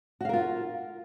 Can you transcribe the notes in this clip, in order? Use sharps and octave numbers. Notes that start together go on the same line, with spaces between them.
F4 F#4 A#4 F5